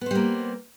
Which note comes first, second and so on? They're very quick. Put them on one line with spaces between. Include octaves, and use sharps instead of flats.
B3 C5 G3 A#3